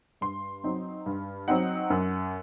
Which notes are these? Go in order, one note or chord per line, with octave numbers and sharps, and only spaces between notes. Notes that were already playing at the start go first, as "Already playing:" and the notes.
G2 C6
F#3 C4 D#4
G2
F#3 C4 D#4 F#5
F#2